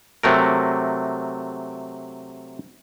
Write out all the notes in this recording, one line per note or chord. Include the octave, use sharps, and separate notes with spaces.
C3 F#3 A3 A#4